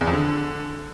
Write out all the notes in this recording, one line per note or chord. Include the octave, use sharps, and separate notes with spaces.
E2
F2
D3